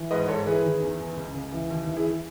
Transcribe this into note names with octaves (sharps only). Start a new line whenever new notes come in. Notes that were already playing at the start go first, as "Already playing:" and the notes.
Already playing: E3
G#2 B4 D#5
G#2 A4 C#5
E3 G#4 B4
D#3
E2
E2
C#2
C#2
E3
D#2
E3
E4 G#4